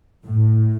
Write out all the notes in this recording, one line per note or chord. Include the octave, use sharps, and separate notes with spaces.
A2